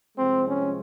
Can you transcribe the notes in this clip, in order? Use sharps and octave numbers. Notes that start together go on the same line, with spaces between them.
C2 C3 F3 G#3 C4
C#4